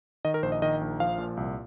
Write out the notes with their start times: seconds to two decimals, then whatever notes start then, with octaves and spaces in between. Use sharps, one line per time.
0.25 D#3 D#5
0.34 A#4
0.43 A#1 C5
0.52 D#5
0.62 D#3 D#5
0.81 A#1
1.00 F3 F5
1.18 A#2
1.37 C2